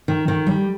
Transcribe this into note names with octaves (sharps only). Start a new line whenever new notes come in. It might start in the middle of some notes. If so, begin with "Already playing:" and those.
D#3
D#3
G3